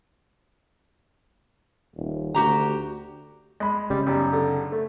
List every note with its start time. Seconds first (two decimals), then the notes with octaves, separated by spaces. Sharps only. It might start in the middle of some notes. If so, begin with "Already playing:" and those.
1.96 D#1
2.35 D2 F#4 G4 A#5
3.60 G#3 B5
3.90 C#3 G3
4.07 B1 F#2 G3
4.32 D3
4.72 A3